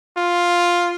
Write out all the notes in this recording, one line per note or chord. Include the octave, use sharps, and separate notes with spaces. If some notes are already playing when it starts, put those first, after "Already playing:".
F4